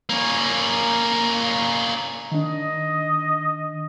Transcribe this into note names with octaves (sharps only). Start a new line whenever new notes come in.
A#3 C#4
D#3 D4 D#5